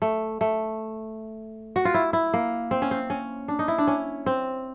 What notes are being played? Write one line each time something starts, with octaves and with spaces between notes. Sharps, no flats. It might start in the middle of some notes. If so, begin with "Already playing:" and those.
A3
A3
F#4
F4
E4
E4
A#3
C4
C#4
C4
C#4
D4
D#4
E4
D4
C#4
C4